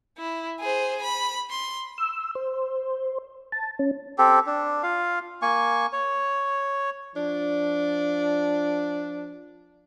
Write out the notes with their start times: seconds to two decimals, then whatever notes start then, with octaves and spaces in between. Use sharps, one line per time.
0.18 E4
0.61 G#4 C5
1.02 B5
1.50 C6
1.98 E6
2.35 C5
3.52 A5
3.79 C#4
4.18 C4 G4 A4
4.46 D4
4.83 F4 F5
5.42 A#3 G#5 C#6
5.93 C#5
7.16 F3 D4